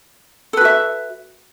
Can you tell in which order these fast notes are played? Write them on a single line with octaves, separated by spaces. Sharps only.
A4 B4 F#4 E5